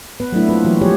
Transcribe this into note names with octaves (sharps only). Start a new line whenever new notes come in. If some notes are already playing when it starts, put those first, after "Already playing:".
B3 B4
F#3 A3 D4 E4
A#3 C4 F4 B4
E3 F#3 F#4
F3 G3 G4 G#4 C#5